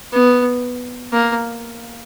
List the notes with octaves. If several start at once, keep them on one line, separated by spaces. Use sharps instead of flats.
B3
A#3